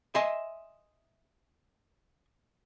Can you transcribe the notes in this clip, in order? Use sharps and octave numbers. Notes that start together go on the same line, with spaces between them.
D#5 E5 G#5 C6